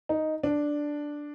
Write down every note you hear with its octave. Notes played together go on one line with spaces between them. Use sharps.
D#4
D4